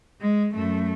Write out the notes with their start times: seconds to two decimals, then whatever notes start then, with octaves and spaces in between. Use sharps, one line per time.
0.21 G#3
0.52 F#2 A3